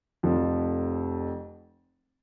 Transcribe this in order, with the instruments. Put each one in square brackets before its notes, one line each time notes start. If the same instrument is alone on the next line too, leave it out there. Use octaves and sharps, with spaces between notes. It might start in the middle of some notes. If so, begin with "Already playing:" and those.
[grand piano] F1 F2 F3